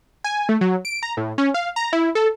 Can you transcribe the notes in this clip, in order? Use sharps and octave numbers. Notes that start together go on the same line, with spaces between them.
G#5
A3
F#3
D7
A#5
A2
C#4
F5
A#5
E4
A4